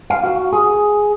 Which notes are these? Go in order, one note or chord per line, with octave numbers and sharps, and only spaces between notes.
F5
F#4
G#4